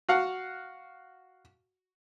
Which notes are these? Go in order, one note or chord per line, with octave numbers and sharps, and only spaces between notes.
F#4 F5 F#5